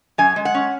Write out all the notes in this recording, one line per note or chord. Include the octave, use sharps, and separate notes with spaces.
F#2 G#5
G#3
F#5
C#4